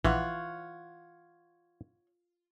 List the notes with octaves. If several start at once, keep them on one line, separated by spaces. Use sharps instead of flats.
A#1 E3 F4 C#5 F#5